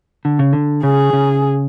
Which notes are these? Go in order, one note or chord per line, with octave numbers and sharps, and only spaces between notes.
D3
C#3
D3
C#3 G#4
C#3